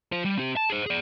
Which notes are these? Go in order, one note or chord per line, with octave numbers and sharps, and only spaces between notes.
F4 C5
G3
C4 G4
A5
G#4 C5
G#4 D5